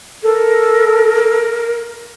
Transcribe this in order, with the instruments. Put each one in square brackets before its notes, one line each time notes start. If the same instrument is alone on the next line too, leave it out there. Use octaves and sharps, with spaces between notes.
[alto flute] A4 [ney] A#4